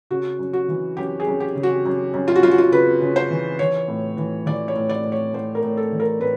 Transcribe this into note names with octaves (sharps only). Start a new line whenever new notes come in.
C#3 F#4
F#2
F#4
E3
F#2 G4
G#4
F#2
G4
C#3
F#4
F#2
F#2
F4
F#4
F#2 F4
F#4
F4
C#3 B4
C#3
C5
E3
E3 C#5
A2
E3
E3 D5
C#5
A2
D5
A2
C#5
A2 C5
A#4
A2
A4
E3
A#4
A2 B4